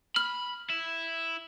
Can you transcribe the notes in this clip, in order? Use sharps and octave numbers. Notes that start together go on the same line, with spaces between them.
B5 F6 F#7
E4